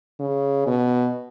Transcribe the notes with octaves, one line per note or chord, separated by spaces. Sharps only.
C#3
B2